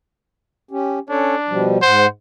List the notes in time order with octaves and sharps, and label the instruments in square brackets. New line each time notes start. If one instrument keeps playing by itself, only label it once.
[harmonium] C#4 G4
[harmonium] C#4 A4 C#5 [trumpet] D4
[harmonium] B2 F3 G3
[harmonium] G#2 F#5 [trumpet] C5